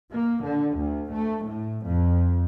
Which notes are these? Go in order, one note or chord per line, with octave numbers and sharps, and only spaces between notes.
A#3
D3
D2
A3
A2
F2